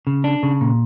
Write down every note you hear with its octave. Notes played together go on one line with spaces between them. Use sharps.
C#3
D4
C#3
A#2